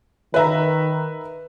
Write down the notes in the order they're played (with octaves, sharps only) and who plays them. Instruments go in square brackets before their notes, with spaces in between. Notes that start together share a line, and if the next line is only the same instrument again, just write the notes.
[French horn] D#3 [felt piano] B4 E5 A#5